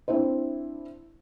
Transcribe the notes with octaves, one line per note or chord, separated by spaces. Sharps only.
C4 D4 E4 C5